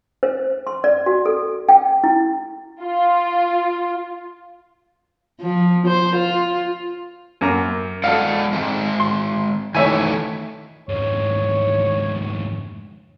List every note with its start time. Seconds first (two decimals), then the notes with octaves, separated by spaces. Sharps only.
0.23 C5
0.67 C6
0.84 D5
1.06 F#4
1.26 A4
1.69 G5
2.04 E4
2.81 F4
5.41 F3
5.87 C5
6.16 F4
7.41 F#2 A#3 A#5
8.04 G#3 A4 D5 F5 F#5
8.53 G#3 C4
9.00 C6
9.75 D#3 E3 A3 C#5 E5 G#5
10.89 F2 G#2 C#5